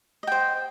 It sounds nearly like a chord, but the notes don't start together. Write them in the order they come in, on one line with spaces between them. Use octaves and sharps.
D#5 G5 C5